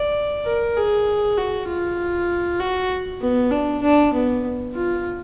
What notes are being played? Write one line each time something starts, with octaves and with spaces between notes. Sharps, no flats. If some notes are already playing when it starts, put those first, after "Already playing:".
Already playing: D5
A#4
G#4
F#4
F4
F#4
B3
D4
D4
B3
F4